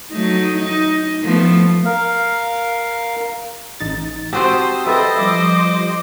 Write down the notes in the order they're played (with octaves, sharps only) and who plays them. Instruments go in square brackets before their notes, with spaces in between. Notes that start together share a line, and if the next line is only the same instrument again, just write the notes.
[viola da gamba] F#3 A3 D#4
D#4
F3 A3 B3
[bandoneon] A#4 F5
[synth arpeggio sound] A1 D#4 A6
[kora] C4 F#4 G4 [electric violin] C5 [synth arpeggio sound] A5 D#6 [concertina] E6
[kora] A4 B4 G5 [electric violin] C5 D#5 [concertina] E5
[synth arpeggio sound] F3 G3 [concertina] D6